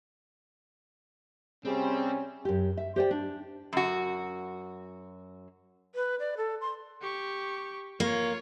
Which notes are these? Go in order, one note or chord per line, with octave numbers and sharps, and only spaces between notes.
C3 G3 C4 C#4 G#4
F#2 G4
E5
G4 C5 D5 G5
D4
F#2 F#4
B4
D5
A4
C6
G4 C#6
A#3 F4 C#5